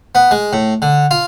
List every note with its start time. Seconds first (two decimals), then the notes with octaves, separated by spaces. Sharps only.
0.15 B3
0.31 G#3
0.53 A2
0.82 D3
1.11 F4